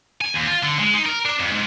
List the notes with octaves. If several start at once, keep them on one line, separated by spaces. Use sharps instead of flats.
G#5
D#2
F4
D3
G#3
D#4
A#4
D4
F2
G#2